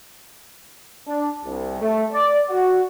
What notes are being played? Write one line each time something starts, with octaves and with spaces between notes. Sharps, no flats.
D4
C2
A3
D5
F#4